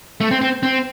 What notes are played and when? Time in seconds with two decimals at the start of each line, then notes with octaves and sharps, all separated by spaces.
0.21 A3
0.31 C4
0.41 C4
0.63 C4